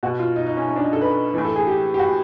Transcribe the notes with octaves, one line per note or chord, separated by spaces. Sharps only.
B2 F#4
F4
D#4
D#4
C#4
C#4
D4
D#4
A4
B4
A2 E3
A4
G#4
G4
G4
F#4